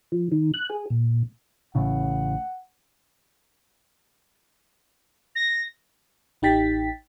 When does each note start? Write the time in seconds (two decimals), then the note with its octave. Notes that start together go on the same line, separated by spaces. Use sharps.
0.12 F3
0.32 D#3
0.54 F#6
0.70 G#4
0.90 A#2
1.75 A1 A2 C#3 F#5
5.35 A#6
6.42 A1 D#4 G4 G5 A6 B6